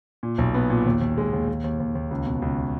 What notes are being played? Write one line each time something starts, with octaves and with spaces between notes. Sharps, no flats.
A#2
B1
B3
A#2
D#2
D#2
G#3
D#2
D#2
D#2
D#2
D#2
C#2
B2
C#2